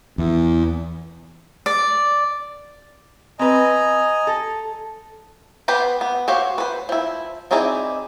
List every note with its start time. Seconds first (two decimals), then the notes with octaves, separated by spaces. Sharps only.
0.18 E2
1.66 D5
3.39 C4 B4 D#5 G#5 A#5
4.27 A4
5.68 B3 G4 B4 C5 G5
6.01 B3
6.28 F#4 G4 C5 C#5 F5
6.58 B4 C5
6.89 F3 E4
7.51 C4 D#4 E4 G#4 D5